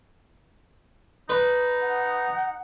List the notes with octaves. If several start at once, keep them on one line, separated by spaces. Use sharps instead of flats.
D#4 B4
F#5